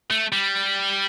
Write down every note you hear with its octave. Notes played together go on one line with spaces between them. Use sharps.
A3
G3